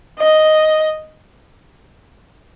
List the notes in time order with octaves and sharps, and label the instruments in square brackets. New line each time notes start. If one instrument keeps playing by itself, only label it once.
[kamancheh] D#5